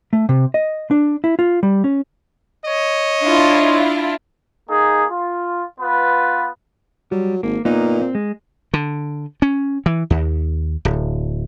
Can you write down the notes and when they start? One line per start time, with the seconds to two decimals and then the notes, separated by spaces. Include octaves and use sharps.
0.13 A3
0.29 C3
0.54 D#5
0.91 D4
1.24 E4
1.39 F4
1.63 G3
1.84 C#4
2.63 C#5 D#5
3.21 D4 E4 F4
4.70 A#3 D#4 G#4
5.10 F4
5.81 B3 F4 B4
7.12 F#3 G3
7.43 G#1 A#3
7.65 A#2 A#3 B3 D#4
8.02 C4
8.15 G#3
8.74 D3
9.42 C#4
9.86 E3
10.10 D#2
10.85 D1